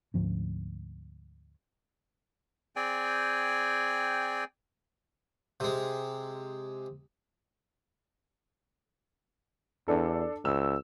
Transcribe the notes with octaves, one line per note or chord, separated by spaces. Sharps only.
D2 G#2 F3 C#4
C4 G#4 D5 G5 G#5
C3 G#3
E2 D4 A4
C#2 E6